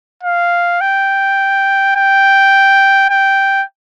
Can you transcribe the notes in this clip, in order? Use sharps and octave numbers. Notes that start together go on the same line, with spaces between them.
F5
G5
G5
G5